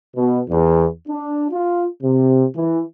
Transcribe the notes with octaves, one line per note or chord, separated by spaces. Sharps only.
B2
E2
D4
F4
C3
E3